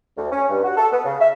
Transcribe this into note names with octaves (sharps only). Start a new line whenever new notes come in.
D2
C#4
G2
F#4
A4
B3
C#3
E5